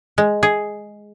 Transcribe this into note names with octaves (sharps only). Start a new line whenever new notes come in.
G#3
G#4